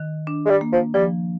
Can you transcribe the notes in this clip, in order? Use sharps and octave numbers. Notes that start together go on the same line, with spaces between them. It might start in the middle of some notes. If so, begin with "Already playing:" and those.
Already playing: D#3
D4
G#3
G3
A#3
F3
F3 G3